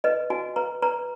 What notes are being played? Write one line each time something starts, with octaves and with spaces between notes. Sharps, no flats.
B4 D#5
F#4 G#5
B4 A#5
B4 A#5